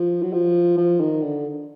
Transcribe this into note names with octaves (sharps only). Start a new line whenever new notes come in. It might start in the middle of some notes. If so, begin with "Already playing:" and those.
Already playing: F3
F#3
F3
F3
D#3
D3